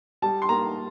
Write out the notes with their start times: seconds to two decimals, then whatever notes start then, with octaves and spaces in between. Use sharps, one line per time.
0.22 G3 A5
0.42 C6
0.49 A#3 A#5